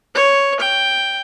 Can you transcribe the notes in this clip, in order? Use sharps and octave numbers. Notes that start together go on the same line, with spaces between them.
C#5
G5